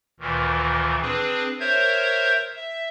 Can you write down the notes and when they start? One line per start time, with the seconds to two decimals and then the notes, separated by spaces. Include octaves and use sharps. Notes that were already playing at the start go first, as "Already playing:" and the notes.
0.20 D2 A#2 D#3 E3
1.02 C4 D4 G#4 B4
1.60 A#4 C5 C#5 E5 G6 G#6
2.56 E5